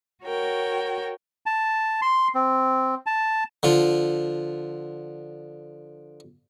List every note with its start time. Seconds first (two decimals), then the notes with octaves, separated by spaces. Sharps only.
0.24 F#4 A#4 C#5 G5
1.46 A5
2.02 C6
2.35 C4
3.06 A5
3.63 D3 F3 F4